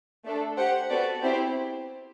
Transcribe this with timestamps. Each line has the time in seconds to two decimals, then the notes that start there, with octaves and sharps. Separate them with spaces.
0.24 A3 D4 A4
0.57 G4 C5 F#5
0.90 B3 F#4 A4 D5
1.23 C4 E4 G4 C5